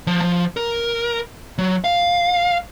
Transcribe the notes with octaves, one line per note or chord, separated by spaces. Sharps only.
F3
F3
A#4
F#3
F5